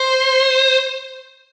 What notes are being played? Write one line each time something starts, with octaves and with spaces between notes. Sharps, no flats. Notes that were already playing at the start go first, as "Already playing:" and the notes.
Already playing: C5